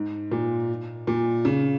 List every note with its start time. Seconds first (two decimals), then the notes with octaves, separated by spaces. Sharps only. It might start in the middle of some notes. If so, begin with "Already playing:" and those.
Already playing: G#2
0.31 A#2
1.07 A#2
1.45 C#3